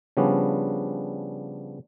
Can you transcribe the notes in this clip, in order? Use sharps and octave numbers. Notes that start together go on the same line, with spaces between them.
C#3 F3 G3 B3 C#4 D4